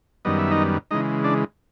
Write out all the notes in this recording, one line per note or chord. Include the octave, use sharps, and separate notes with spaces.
F#2 D#3 G3 B3 D#5
E5
D#4 D#5
C#3 E3 G#3 D#4 D#5
D4 D5